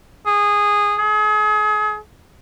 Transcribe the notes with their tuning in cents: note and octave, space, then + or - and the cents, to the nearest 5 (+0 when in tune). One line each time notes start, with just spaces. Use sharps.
G#4 -15
G#4 +35